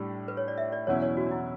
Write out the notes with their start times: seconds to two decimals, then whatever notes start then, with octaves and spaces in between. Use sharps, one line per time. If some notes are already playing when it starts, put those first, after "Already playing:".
Already playing: A2 G3 D4
0.28 B4
0.37 C#5
0.48 D5
0.58 E5
0.72 D5
0.87 E2 B2 F#3 C#4 E4 C#5
1.02 C#5
1.17 F#4
1.27 D4
1.31 E4